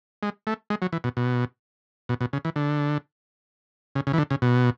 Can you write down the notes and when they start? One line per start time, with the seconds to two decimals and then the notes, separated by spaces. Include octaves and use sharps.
0.23 G#3
0.47 A3
0.70 G#3
0.82 F#3
0.93 E3
1.04 B2
1.17 B2
2.09 B2
2.21 B2
2.33 C#3
2.45 E3
2.56 D3
3.95 C#3
4.07 C#3
4.13 E3
4.18 D3
4.31 C#3
4.42 B2